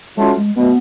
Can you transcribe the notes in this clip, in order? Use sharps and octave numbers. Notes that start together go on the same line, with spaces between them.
F#3 G#3 A3 C#4 F4
G#3
B2 F#3 A3 B3